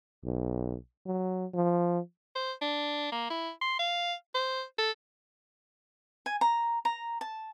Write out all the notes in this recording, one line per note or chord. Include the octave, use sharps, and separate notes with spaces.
B1
F#3
F3
C5
D4
A#3
E4
C6
F5
C5
A4
G#5
A#5
A#5
A5